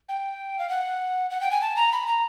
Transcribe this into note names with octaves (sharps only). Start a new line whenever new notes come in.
G5
F5
F#5
F#5
G5
G#5
A5
A#5
B5
A#5